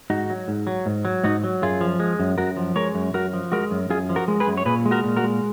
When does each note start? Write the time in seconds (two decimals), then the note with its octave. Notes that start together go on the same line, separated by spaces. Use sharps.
0.10 G#2 D#4 F#4
0.30 F#3
0.48 G#2
0.67 F#3
0.86 G#2
1.05 F#3
1.24 G#2 D#4 F#4
1.44 F#3
1.62 F#2 F4 G#4
1.81 F3
2.00 G#3
2.20 F#2
2.38 F#2 F#4 A#4
2.57 F3
2.76 G#3 A#4 C#5
2.95 F#2
3.14 F#2 F#4 A#4
3.33 F3
3.52 G#3 F#4 A#4
3.71 F#2
3.90 F#2 F4 G#4
4.09 F3
4.16 F#4 A#4
4.28 G#3
4.40 G#4 B4
4.47 F#2
4.57 C#5
4.65 A#2 G#4 B4
4.86 G#3
4.91 F#4 A#4
5.04 A#2
5.17 F#4 A#4
5.24 G#3